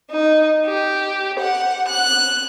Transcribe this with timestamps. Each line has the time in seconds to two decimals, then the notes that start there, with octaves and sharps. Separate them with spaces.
0.12 D#4
0.66 G4
1.40 F#5
1.88 F#6